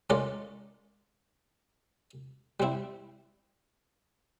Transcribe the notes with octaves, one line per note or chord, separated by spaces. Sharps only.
G#3 C#4 F4 A#4 D5
G3 C4 E4